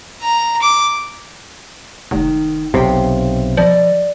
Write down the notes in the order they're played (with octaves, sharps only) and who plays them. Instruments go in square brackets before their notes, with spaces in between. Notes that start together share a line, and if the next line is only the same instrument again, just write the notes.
[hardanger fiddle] A#5
D6
[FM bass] F1 [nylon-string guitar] D#3
[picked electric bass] B1 C3 [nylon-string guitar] F5 G5
[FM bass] F3 [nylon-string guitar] D5 D#5